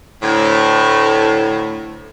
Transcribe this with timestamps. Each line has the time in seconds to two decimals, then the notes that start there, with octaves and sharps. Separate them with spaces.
0.22 D2 A2